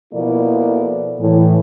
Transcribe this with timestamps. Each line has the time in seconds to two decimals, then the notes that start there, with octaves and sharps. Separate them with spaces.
0.13 B2 F3 A#3 E4 A4 D5
1.20 A2 E3